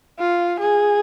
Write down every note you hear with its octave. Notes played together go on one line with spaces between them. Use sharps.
F4
G#4